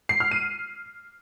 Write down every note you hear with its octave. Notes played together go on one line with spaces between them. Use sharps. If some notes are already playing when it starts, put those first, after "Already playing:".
C7
F6
D#7